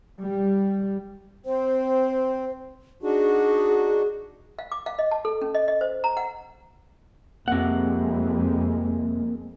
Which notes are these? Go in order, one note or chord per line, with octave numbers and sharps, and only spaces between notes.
G3
C4 C5
D4 D#4 F#4 G#4
F5
D6
F5
D#5
A5
A4
C#4
D#5
D#5
C5
A#5
F#5
F2 C3 G#3 A#3 F#5